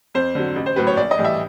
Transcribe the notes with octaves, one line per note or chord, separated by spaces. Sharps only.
F2 C5
D3 F#3
A1
C5
A2 F#3 B4
C#5
A#1 D5
D#5
A2 E3 G3
E5